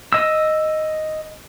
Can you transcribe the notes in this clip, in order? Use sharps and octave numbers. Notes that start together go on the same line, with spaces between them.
D#5 E6